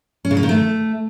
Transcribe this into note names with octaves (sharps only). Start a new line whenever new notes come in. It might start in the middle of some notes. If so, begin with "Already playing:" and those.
C#4
C#3
A#3
D#3
A3